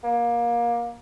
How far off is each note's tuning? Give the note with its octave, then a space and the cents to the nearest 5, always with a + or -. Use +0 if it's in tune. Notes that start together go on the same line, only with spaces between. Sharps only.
A#3 +25